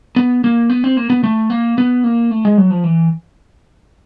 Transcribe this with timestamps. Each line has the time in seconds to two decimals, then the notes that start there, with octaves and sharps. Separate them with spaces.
0.16 B3
0.44 A#3
0.70 B3
0.84 C4
0.97 A#3
1.10 B3
1.24 A3
1.50 A#3
1.78 B3
2.04 A#3
2.31 A3
2.45 G#3
2.58 F#3
2.70 F3
2.84 E3